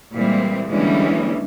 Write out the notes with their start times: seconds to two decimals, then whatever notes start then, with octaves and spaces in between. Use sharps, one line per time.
0.14 A#2 E3 G3 G#3 C4
0.71 D3 E3 G3 G#3 A#3 C#4